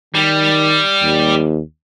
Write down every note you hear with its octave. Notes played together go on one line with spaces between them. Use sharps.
D#3 G3
D#2